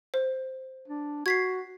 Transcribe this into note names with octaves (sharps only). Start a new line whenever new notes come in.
C5
D4
F#4 G#6 B6 C7